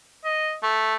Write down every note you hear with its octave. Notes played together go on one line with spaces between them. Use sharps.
D#5
A3